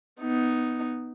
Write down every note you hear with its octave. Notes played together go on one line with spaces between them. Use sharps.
B3 D#4